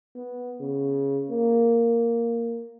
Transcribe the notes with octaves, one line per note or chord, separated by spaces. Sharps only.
B3
C#3
A#3